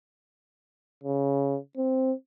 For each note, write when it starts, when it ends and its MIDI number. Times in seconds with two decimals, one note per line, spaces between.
1.04 1.57 49
1.77 2.12 60